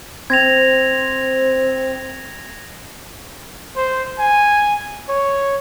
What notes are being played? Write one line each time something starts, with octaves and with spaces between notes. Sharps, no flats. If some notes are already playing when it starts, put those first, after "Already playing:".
C4 G#6 A#6 F7
C5
G#5
C#5